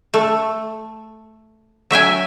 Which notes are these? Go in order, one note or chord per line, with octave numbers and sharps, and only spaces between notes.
A3
F#3 E5 G5 G#5